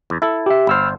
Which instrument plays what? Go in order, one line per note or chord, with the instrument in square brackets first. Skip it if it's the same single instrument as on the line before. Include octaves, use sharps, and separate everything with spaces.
[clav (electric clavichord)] E2
E4 A4
[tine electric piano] G4 E5
[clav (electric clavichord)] G1 C5 [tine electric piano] B5 E6 F6